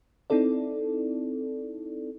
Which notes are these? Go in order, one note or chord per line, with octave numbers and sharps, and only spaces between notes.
C4 D#4 E4 A4 D5